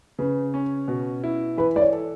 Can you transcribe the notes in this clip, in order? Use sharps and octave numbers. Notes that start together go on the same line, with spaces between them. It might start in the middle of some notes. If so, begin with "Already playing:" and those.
C#3 B4
C#4
B2
E4
E3 B4
D5
C#5
A4